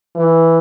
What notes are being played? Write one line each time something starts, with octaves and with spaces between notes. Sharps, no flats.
E3